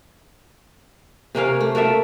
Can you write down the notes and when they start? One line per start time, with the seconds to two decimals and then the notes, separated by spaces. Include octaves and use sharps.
1.35 C3 A#3 C#4 F5
1.61 A3
1.75 A#3 F#4 A4 E5